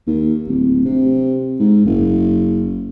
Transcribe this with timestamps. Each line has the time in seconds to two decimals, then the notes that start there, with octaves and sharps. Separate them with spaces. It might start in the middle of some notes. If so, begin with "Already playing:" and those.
0.07 D#2
0.48 D1
0.85 C3
1.60 G#2
1.85 F#1